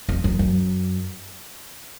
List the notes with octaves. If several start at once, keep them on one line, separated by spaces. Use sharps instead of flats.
F2
F#2
F#2